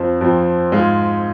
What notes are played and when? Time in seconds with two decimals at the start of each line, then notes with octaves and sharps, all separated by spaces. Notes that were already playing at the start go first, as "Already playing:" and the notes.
Already playing: F2 F3 C4
0.21 F2 F3 C4
0.72 G#2 G#3 F4